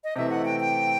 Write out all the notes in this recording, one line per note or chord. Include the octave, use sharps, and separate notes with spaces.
D#5
C3 E3 A3 E5
F#5
G5
G5